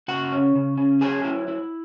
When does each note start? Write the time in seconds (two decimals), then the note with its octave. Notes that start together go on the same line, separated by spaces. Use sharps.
0.08 C#3 F#4 F#5
0.32 C#4
0.55 C#3
0.77 C#4
1.01 F#3 G#4 G#5
1.24 E4
1.48 E4